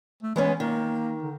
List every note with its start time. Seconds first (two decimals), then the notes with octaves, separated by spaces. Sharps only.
0.23 A3
0.36 E3 G#3 B3 C#4
0.60 D#3 A#3
1.23 D3